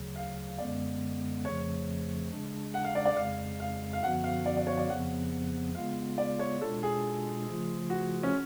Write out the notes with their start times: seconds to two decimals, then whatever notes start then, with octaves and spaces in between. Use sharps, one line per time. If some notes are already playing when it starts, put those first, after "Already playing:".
Already playing: D2 C#3 F#3
0.16 F5
0.58 F#2 D3 G#3 B3 D5
1.44 F2 C#3 F3 A3 C#5
2.31 C#3 G#3 D4
2.74 F#5
2.84 F5
2.95 D5
3.05 D5
3.16 F2 C#3 G#3 F5
3.60 F5
3.93 F5
4.02 F#2 D3 F3 B3 F#4 F#5
4.24 F5
4.46 D5
4.57 D5
4.67 C#5
4.77 D5
4.89 F2 C#3 F3 B3 F#5
5.74 C#3 G#3 B3 F4 F5
6.18 D5
6.39 C#5
6.61 B2 G#3 D4 F4 A4
6.83 G#4
7.47 C#3 F3 A3 F4
7.90 F#4
8.23 C#4